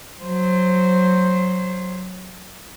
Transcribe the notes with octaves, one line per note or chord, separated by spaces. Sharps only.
F#3 C5